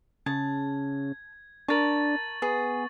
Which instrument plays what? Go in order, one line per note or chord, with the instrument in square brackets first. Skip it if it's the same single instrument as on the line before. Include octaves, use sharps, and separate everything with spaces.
[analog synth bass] C#3 [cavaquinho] A5 [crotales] G#6
[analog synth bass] D4 [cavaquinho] A#4 A5 [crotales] C#6 A6 F#7
[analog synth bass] B3 [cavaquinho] G#4